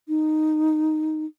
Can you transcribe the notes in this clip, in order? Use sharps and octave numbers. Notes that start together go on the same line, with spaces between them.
D#4